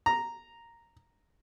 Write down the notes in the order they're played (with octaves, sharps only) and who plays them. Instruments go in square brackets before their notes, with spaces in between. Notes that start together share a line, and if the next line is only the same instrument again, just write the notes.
[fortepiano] A#5